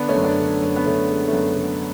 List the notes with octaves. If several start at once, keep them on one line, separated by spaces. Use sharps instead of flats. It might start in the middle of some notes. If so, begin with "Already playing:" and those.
Already playing: D3 B3 D4
A3 C#4
F#2
B3 D4
D3
F#2
B3
D3 A3 C#4
G#3
A3
F#2 B3
D3